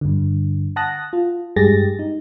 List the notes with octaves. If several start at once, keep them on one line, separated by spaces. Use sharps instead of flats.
G2 D3
F#5 A5 D#6 F#6 A#6
F4
G2 G#3 G4 G#4 A6 A#6
D#4